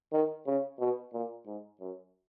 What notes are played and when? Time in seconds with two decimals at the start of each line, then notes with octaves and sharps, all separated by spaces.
0.12 D#3
0.46 C#3
0.79 B2
1.13 A#2
1.47 G#2
1.80 F#2